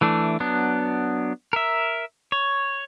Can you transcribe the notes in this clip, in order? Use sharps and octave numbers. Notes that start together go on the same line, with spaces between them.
E3 A3 D4
F#3 B3 D4
A#4 E5
C#5